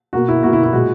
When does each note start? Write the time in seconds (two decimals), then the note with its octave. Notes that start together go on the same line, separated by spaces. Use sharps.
0.13 B2 A#3 F#4
0.28 E4
0.43 B2 A#3 F#4
0.53 E4
0.64 E4
0.73 A#2 G#3 F#4